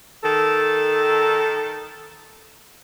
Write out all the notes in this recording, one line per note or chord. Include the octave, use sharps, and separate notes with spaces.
D#3 A4